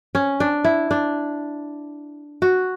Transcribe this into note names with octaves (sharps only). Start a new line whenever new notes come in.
C#4
D4
E4
D4
F#4